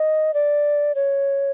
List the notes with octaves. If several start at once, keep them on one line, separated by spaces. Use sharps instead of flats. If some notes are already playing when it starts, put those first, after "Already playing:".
Already playing: D#5
D5
C#5